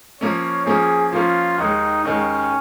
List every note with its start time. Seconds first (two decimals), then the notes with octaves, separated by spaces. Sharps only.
0.21 F3 A#3 C#4 C#5
0.66 F3 A#3 C#4 G#4
1.13 F3 A#3 C#4 F4
1.58 D#2 D#3 G#3 D#4
2.05 D#2 D#3 G#3 C#4